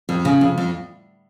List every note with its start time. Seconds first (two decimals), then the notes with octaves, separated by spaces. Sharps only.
0.09 F2
0.25 C#3
0.41 F2
0.58 F2